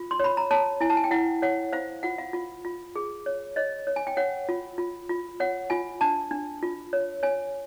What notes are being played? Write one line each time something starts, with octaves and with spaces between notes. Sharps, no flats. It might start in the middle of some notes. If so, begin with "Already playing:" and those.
Already playing: F4
C6
C#5 B5
A#5
C#5 A5
E4 G#5
A5
G#5
G5
E4 F#5
C#5 F#5
C5 F5
F4 F#5
F5
F4
F4
G#4
C#5
C#5 D#5
C#5
G#5
G5
C#5 F#5
F4
F4
F4
C#5 F#5
F4 G#5
D4 A5
D4
F4
C#5
C#5 G#5